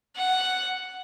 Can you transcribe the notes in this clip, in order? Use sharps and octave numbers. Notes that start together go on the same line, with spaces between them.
F#5